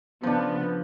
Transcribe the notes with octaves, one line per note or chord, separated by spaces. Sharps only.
C#3 F3 B3 D4